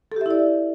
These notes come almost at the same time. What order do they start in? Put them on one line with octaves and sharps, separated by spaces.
A4 G4 E5 E4 D5